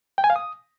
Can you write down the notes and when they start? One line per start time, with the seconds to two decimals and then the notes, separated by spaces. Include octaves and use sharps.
0.18 G5
0.24 G#5
0.30 F5
0.36 D#6